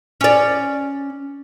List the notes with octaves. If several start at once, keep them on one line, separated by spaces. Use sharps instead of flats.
C#4 D5